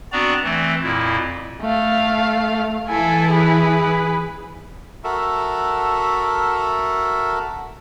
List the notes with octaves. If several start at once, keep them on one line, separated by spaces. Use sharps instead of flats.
B3 C4 D4 F#4 D5 A#5
E3 A3 C4
F2 A#2 E4
A3 F5
E3 E4 A4 G#5
G#4 B4
F#4 A4 A#4 E5